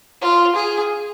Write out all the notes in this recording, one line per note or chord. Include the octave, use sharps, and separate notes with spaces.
F4
G#4